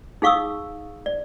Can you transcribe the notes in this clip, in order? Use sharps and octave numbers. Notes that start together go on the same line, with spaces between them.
D#4 G#4 F5 C#6 D#6 E6
D5